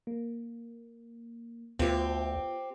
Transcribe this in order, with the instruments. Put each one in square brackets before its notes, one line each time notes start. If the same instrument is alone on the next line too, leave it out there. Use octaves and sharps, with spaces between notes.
[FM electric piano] A#3
[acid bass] D2 [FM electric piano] B3 F4 [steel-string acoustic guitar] C4 G4